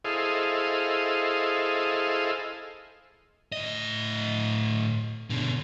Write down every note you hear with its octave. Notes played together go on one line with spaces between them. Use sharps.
E4 G#4 A4 C5 D#5 F5
A2 D#5
B2 D3